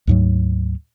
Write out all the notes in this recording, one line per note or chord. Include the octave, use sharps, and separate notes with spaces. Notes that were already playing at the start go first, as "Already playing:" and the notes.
D2 G#2 F#3